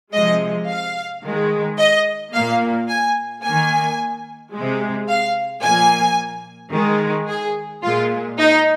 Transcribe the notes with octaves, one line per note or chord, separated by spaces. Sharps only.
C3 F3 G#3 D#5
F5
D#3 G#3
D#5
A#2 A#3 F5
G#5
D#3 A#3 G#5
C3 G#3
F5
A#2 F3 A#3 G#5
D#3 G#3
G#4
A#2 G#3 F4
D#4